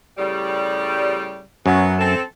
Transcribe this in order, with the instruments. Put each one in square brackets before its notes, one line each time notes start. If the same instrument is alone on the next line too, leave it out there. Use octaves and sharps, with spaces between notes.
[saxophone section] A2 C#3 G3
[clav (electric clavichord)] F#2 [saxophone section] F#3 B3
[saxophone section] C4 A4